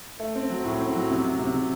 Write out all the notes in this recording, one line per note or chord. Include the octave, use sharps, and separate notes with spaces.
A3
C4
F#3
A2
C4
F#3
C3
C3
C3
C3